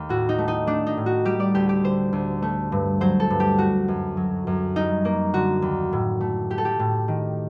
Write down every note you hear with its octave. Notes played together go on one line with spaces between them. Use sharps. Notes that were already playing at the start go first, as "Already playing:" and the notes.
Already playing: D#2 A3
A2 F#4
D#4
A3
D#4
A3 D4
D#4
A2
F#4
G3 G4
D5
D2 G4
G4
D3 C5
D2
A3
G2
F#3 C5
A4
G2
G4
A3 F#4
F#2
F#3
F#2
G3 D#4
A#3
D3 F#4
D#2
A2
A3
A3 G4
A4
G4
A2
D#3